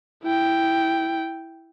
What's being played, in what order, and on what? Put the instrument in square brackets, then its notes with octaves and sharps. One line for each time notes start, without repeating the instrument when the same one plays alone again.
[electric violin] E4 G5